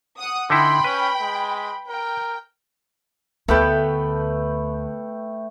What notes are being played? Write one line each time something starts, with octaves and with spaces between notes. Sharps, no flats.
F#5 D#6
D3 D#4 E4 G5 B5 C6
C#4 B4
G#3
A#4 G5
D2 A3 B3 A4 B4 G5